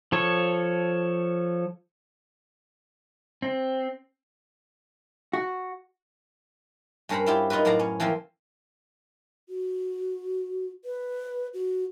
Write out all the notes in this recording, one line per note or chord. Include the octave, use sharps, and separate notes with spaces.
F3 A4 C#5
C4
F#4
G2 C#4 A#4 C5 A#5 B5
E4 F4 G4
D#4 F4 F#4 A#4 B4
F#2 A2 D5 F5 A#5
C#4
E3 F3 A#3 C4 F4
F#4
B4
F#4